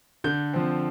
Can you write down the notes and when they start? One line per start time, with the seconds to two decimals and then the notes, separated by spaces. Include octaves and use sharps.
0.24 D3 G6
0.53 F3 C4